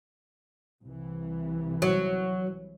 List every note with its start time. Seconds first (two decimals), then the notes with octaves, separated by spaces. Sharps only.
0.83 C2 E3
1.82 F#3